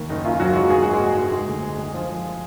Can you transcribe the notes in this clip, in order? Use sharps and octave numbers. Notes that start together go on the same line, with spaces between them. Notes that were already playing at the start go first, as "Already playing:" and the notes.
Already playing: D#2
F#1 D#4
F#2 F4
F#1 F#3 F#4
F#3 G#3 F#4
G#3 G#4
G#2 F#4
G#3 G#4
A#1
G#3
G#3
D2
G#3
G#3
F3
F3